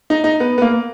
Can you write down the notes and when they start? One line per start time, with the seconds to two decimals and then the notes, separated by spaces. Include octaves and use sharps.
0.10 D#4
0.24 D#4
0.40 B3
0.58 B3
0.62 A#3